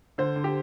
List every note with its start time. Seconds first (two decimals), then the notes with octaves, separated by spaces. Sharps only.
0.18 D3 C5
0.36 D3
0.44 G4